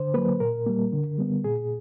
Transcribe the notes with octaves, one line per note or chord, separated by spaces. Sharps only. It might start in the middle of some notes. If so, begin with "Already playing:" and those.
Already playing: D3 C5
F#3 A#3 B4
A#2 A#4
G3 A#3
D3
G3 B3
A#2 G#4